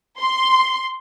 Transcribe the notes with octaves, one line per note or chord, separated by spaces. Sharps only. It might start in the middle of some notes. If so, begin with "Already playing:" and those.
C6